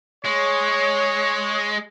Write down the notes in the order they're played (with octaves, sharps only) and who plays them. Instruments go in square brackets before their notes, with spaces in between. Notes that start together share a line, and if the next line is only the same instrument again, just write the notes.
[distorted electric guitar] G#3 [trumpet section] C#5